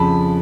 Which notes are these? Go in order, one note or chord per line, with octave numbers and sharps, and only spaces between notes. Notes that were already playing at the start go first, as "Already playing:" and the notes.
Already playing: F2 C#3 F3 A5 B5